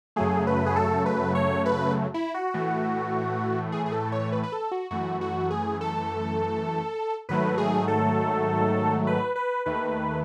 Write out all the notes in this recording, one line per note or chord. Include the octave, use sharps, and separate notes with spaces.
F#2 C#3 F#3 A3 G#4
B4
G#4
A4
B4
C#5
B4
E4
F#4
A2 E3 A3
G#4
G#4
A4
C#5
B4
B4
A4
F#4
F#2 E3 A3 F#4
F#4
G#4
A4
G#2 D#3 F#3 A3 B4
G#4
A4
B4
B4
D#2 D#3 A3 B4